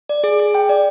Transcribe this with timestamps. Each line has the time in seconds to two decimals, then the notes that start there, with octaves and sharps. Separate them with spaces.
0.09 D5
0.24 G#4
0.40 G#4
0.55 G5
0.69 D5